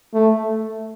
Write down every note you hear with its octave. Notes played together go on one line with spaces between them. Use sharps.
A3